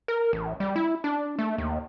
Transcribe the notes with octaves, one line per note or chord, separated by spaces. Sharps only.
A#4
A1
G3
E4
D4
A3
D#2